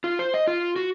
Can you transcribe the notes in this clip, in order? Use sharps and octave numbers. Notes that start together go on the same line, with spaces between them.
F4
C5
D#5
F4
F#4